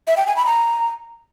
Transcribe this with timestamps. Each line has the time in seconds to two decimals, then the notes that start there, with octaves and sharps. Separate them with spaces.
0.07 E5
0.17 G5
0.27 G#5
0.36 B5
0.46 A#5